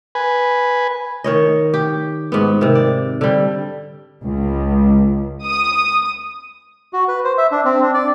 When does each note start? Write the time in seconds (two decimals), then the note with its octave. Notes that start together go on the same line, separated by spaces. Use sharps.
0.15 B4 G#5
1.24 D#3 C#5 D#5
1.74 G4
2.32 G#2 B3
2.61 C3 D#3
2.75 D5
3.21 D3 G3
4.26 C#2
5.43 D#6
6.93 F#4
7.08 B4
7.24 C5
7.38 E5
7.51 D4
7.65 C4
7.82 D4
7.94 D5